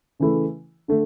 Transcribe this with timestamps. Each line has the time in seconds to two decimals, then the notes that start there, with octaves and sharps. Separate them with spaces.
0.19 C#3 E3 A3 E4
0.88 D3 A3